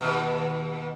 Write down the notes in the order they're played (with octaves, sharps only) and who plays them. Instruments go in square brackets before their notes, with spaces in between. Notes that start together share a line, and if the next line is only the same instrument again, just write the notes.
[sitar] D#2 B2